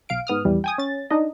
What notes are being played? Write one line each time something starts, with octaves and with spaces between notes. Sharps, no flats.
B1 F5 D7
G#2 B3 D#6 F6
A#1 E2 E3 G3
G5 G#5 D#6
C#4 A6
D4 D#4 D#5